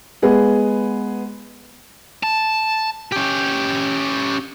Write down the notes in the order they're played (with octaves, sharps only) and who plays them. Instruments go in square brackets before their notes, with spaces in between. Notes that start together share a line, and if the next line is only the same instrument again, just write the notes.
[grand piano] G#3 B3 G#4
[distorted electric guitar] A5
C#4 G4